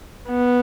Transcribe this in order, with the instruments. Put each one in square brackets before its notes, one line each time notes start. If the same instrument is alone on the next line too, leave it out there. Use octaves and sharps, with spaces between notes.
[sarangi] B3